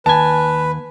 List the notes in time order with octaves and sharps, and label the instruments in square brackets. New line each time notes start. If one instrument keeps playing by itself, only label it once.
[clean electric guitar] D#2 G#5 [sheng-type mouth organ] B4 [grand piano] A5